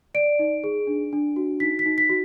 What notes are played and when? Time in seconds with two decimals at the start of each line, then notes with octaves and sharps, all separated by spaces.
0.15 D5 D7
0.39 D#4
0.64 G#4
0.87 D4
1.13 D4
1.36 F#4
1.60 D#4 B6
1.79 B6
1.86 D#4
1.98 B6
2.09 F#4